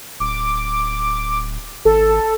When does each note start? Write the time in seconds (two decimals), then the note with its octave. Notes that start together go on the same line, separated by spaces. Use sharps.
0.20 D1 D6
1.85 G#1 A4